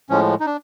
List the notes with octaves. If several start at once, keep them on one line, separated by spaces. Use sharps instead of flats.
A2 F3 G#3 C#4
D#4
D4